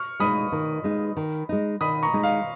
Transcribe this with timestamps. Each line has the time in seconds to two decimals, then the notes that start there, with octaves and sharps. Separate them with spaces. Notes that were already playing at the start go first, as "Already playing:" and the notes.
Already playing: C#6 F6
0.20 G#3 D#4 B5 D#6
0.52 D#3
0.84 G#3 D#4
1.17 D#3
1.49 G#3 D#4
1.81 D#3 B5 D#6
2.03 A#5 C#6
2.13 G#3 D#4
2.23 F5